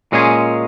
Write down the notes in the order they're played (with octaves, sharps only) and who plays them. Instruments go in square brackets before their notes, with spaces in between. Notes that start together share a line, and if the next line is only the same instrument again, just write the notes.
[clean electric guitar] A#2 G#3 C#4 G#4